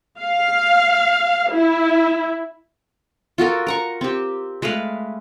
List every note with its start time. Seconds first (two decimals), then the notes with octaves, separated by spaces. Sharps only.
0.20 F5
1.52 E4
3.38 F4 F#4 A4 A#4
3.67 A#4 A#5 C#6
4.01 C4 G4
4.62 G#3 A3 B4 F5